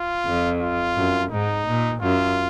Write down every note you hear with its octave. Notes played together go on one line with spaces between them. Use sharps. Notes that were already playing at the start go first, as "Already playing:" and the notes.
Already playing: F4
F2
F4
F#2
G#2 D#4
A#2
F#2 F4